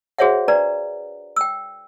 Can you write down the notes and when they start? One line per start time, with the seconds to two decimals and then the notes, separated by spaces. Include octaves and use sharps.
0.18 F#4 G#4 C5 C#5 E5 F#5
0.48 D4 B4 D5 A#5
1.36 G5 E6